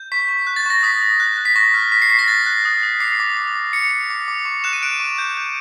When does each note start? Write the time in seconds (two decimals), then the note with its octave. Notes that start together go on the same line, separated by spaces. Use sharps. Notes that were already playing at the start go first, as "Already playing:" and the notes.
Already playing: G6
0.12 C#6 B6
0.29 C#6
0.47 F#6
0.56 A6
0.66 C#6 A#6
0.83 D#6 B6
1.02 D#6
1.20 F#6
1.38 F#6
1.45 B6
1.56 C#6 A#6
1.74 F6
1.92 C#6 B6
2.02 C7
2.10 C#6 B6
2.19 A#6
2.28 F#6 A6
2.46 F#6
2.65 D#6
2.83 D#6
3.00 D6 C7
3.20 D6
3.37 D6
3.55 D6
3.73 D6 C#7
3.91 D6
4.10 D6
4.28 D6
4.45 C#6
4.64 F#6 E7
4.73 D#7
4.82 F#6 D7
5.00 C#6
5.18 G6
5.37 G6